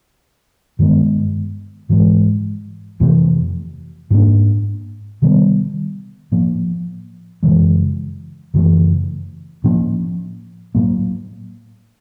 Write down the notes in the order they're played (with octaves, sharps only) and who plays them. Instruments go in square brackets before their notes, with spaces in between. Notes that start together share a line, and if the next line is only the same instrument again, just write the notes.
[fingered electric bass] G2 D#3 G#3 B3
G#2 E3 G#3
F2 C3 E3 A3
G#2 F3 A#3 D4
C3 D#3 G3 B3
A2 F3 A#3
F#2 C#3 E3 G#3
F#2 C#3 E3 A3
A2 F3 A#3 C#4
A2 F#3 A#3